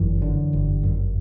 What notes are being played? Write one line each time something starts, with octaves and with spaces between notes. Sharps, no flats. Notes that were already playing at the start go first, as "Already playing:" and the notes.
Already playing: G1 F#2 E3
D3
G1
F#2